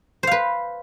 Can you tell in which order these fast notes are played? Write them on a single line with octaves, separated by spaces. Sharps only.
C5 F5 B4